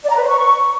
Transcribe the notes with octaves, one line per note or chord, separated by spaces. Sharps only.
D5
A#5
B4
C5
C#6